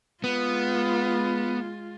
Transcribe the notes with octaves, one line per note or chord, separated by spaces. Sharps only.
G#3 B3 F4